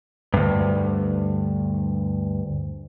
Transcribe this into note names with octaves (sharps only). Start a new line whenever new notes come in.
D2 G2